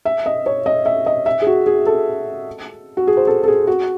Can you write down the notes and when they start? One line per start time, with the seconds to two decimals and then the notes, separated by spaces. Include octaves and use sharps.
0.05 E5
0.26 D#5
0.46 C#5
0.66 D#5
0.86 E5
1.06 D#5
1.26 E5
1.42 G#4
1.47 F#4
1.66 G#4
1.86 A4
2.97 F#4
3.07 G#4
3.17 C5
3.27 A4
3.43 A4
3.48 G#4
3.67 F#4